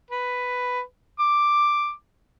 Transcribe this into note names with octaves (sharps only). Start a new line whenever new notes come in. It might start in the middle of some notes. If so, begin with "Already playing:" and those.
B4
D6